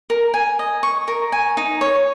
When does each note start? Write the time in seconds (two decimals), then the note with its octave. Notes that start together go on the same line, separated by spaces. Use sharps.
0.10 A#4
0.34 G#5
0.59 D#5
0.83 C#6
1.08 A#4
1.32 G#5
1.57 D#4
1.81 C#5